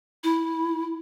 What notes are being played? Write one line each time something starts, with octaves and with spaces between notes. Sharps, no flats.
E4